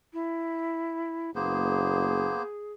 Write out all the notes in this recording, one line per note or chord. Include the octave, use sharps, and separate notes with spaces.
E4
F#1 A#3 B3 G#4 C5